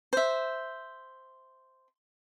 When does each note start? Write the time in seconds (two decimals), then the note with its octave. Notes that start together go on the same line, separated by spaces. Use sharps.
0.13 C5 E5